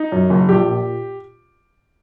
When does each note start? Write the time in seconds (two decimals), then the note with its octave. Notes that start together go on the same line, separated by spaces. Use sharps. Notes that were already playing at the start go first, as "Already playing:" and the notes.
Already playing: D#4
0.12 F#2
0.30 F#1
0.49 A#1 G4
0.66 A#2